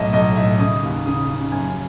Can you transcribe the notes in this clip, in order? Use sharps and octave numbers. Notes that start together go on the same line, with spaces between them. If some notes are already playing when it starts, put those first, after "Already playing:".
Already playing: B1 A2 D#5 E5
B1 D#5
A2 E5
C#3 D#6
D#2
C#3 D#6
C#3
F#2 G#5